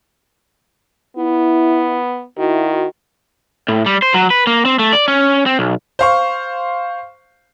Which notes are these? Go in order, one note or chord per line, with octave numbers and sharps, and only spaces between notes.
B3 E4
D#3 E4 F#4
A2
G3
C5
F#3
B4
A#3
C4
A3
D5
C#4
C4
B1
C5 F5 C#6